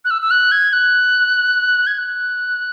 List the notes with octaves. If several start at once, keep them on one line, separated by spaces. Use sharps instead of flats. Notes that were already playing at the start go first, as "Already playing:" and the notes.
F#6
E6
E6
F#6
G#6
F#6
G#6
F#6